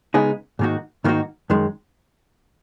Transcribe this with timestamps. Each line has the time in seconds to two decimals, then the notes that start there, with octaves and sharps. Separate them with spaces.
0.14 C#3 G#3 B3 D#4 G#4
0.59 G#2 D#3 A#3 D#4 F#4
1.04 G#2 D#3 A#3 D#4 F#4
1.50 F#2 D#3 G#3